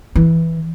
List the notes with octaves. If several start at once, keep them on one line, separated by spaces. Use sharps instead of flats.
E3